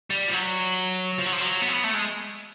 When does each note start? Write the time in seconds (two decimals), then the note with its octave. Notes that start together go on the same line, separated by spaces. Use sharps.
0.10 G3
0.28 F3
0.33 F#3
1.19 F3
1.26 F#3
1.33 F3
1.41 F#3
1.62 B3
1.68 C4
1.73 B3
1.84 A3
1.94 G#3